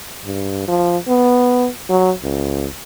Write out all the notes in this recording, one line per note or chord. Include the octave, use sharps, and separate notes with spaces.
G2
F3
B3
F#3
C#2